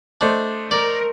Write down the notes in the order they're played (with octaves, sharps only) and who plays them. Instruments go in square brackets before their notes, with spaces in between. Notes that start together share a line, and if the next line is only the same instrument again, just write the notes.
[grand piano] A3 C5 D#5 [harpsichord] D4
[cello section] A#4 [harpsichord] D5